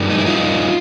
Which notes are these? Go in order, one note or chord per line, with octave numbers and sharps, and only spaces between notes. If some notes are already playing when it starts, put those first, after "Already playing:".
Already playing: G2 D#3 G3
D#4
E4
D#4 F4